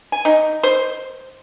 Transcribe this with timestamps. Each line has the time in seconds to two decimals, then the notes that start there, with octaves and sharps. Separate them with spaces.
0.12 G#5
0.25 D#4
0.63 C5